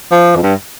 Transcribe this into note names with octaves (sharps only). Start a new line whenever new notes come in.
F3
F2
G2